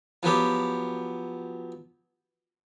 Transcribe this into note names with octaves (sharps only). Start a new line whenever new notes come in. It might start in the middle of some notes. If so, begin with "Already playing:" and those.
F3 F#3 B3 G4